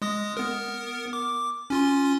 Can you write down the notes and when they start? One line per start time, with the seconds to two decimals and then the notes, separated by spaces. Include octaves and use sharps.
0.02 G#3 D#6 A#6
0.37 B3 A#4
1.13 D6
1.70 C#4 F4 C6